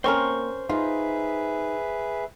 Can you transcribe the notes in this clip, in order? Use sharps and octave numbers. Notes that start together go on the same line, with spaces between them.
A#3 C4 C#4 A#4 C5 C#6
D#4 F4 G#4 B4 E5